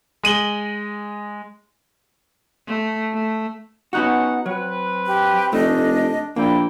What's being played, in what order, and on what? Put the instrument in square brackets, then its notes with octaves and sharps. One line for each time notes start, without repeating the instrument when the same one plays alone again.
[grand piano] G#3 D#7 F#7 G7
[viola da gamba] A3
A3
[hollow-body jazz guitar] B3 D#4 F#4 [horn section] C#4 F#5
[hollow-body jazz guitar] F#3 [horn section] C4 B4
[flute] G4
[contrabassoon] F1 [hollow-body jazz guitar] A3 [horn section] D4 [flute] D#5
[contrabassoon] A#1 [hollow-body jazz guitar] A#3 [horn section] E4 G5 [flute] D5